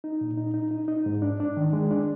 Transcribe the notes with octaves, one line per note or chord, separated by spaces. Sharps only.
D#4
A#2
D#4
D#4
D#4
D#4
G#2
D4
D4
D#3
G#3
D4